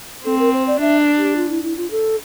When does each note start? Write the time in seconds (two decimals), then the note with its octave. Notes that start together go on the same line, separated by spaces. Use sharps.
0.25 C4 A4
0.39 A#4
0.53 C5
0.67 D5
0.80 D4 E5
1.17 G4
1.36 F4
1.49 E4
1.63 E4
1.77 F4
1.90 A4